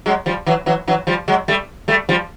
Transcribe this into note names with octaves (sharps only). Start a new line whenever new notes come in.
F#3 G#3
F3 G3
E3 F#3
E3 F#3
E3 F#3
F3 G3
F#3 G#3
G3 A3
G3 A3
F3 G3